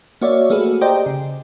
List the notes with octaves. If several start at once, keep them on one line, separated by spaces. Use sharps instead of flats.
A#3 F#4 C#5 D5 E5
A3 A#3 F#4 G#4 A4 B4
G4 C5 D5 D#5 G5 A#5
C#3